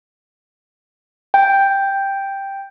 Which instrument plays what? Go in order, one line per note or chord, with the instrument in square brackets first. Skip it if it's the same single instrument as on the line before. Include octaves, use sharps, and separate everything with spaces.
[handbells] G5